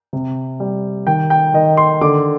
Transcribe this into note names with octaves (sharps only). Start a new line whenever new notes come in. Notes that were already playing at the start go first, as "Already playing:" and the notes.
C3
G3
D#3 G5
G5
D#3 D#5
C6
D3 D6